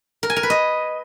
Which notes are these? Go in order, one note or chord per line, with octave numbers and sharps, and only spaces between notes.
A#4
G#5
A#4
B4
D#5